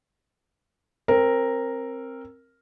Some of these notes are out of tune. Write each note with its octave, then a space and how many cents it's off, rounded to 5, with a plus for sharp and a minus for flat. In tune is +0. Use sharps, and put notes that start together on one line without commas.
C4 +20 A#4 -5